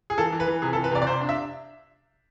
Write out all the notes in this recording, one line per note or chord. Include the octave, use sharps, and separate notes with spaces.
G#4
E3 A4
E3
B4
E3
C3 G#4
A4
E3
B4
C3 D5
D5
C3 C5
D4
E5